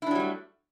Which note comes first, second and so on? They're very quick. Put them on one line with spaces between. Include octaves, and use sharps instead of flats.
E4 D4 F#3 G3 A3